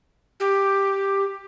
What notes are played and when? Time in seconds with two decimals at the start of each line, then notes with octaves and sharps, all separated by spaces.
0.40 G4